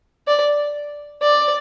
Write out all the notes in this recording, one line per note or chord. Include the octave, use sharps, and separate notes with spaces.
D5
D5